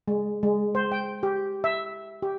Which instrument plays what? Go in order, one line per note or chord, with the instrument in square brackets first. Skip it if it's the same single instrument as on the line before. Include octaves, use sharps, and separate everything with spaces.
[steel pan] G#3
G#3
C5
G5
G4
E5
G4